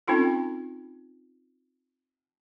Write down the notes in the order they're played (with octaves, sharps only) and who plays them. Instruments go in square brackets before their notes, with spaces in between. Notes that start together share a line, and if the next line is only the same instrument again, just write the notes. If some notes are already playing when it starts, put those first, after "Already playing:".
[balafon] C4 C#4 D#4 F4 A4